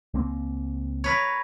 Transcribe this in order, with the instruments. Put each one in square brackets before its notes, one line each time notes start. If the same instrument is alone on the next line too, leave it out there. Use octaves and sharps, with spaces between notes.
[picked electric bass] C#2 A#3 C4
[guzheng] A#4 B4 C#5